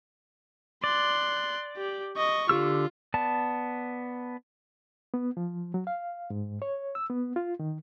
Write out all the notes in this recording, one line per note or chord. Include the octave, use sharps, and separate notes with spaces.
D5 C6 F#6
G4
D#5 C#6
D3 F4 G4 E6
B3 D5 A5
B3
F3
F#3
F5
G#2
C#5
E6
B3
F4
D#3